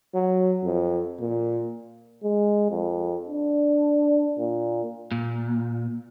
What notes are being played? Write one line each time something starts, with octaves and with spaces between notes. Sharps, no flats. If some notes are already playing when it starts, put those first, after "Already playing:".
F#3
F2
A#2
G#3
F2
D4
A#2
A#2